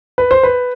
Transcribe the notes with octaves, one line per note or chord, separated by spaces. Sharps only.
B4
C5
B4